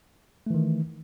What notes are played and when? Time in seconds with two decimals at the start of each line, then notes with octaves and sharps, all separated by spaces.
0.46 A3
0.50 E3
0.54 D#3